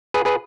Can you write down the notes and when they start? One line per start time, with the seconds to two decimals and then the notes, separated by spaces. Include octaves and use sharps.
0.14 G#4 B4
0.25 G#4 B4